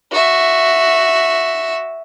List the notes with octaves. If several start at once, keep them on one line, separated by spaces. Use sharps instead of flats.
F#4 E5